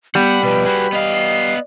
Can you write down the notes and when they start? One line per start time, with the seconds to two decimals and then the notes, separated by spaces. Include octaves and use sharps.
0.15 G3 B3 F#5 B5
0.43 B2 F3 B4
0.66 F#4 G#4 B5
0.92 B3 D#5 F5
1.15 C7